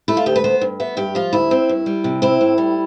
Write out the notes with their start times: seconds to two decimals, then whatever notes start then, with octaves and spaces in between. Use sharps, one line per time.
0.08 A3 E4
0.17 F4
0.26 D2 G4
0.36 B4
0.44 B3 C5
0.61 G2
0.80 B3 E5
0.97 G2 G4
1.15 F3 F4
1.33 D2 E4
1.51 C4
1.69 G2
1.86 G3
2.04 C3
2.22 C4 E4
2.41 A2
2.58 G3